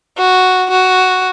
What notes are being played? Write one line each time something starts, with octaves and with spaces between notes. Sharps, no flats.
F#4
F#4